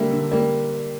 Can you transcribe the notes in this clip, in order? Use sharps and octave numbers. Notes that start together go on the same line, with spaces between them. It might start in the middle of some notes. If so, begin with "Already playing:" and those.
Already playing: D3 G3 A#3 E5
D3
G3 A#3